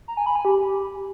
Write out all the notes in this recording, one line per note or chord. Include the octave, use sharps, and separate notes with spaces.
A#5
G#5
B5
G#5
G4